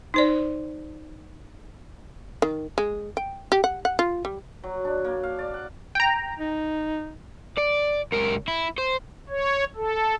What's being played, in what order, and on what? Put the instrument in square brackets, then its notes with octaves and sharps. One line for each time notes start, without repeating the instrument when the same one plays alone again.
[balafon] D#4 C5 D5
[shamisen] D#3
G#3
G5
G4
F#5
F#5
F4
G3
[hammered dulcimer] F#3
D4
A#3
F5
D5
F#5
[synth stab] G5 A#5
[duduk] D#4
[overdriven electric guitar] D5
C#2 A#4
E4
C5
[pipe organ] C#5
A4